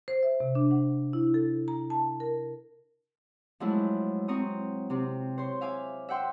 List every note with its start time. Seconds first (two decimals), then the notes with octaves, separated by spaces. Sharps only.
0.08 C5
0.23 E5
0.40 C3
0.55 D4
0.71 F#5
1.13 E4
1.34 A4
1.68 A#5
1.90 A5
2.20 A#4
3.60 F3 F#3 G#3 A3 E4
4.28 F#3 C4 A#5 C#6 D#6
4.90 C3 C4
5.38 C5 C#5 C6
5.61 E5 F5 G#5 D6
6.09 E5 F#5 G5 C6 E6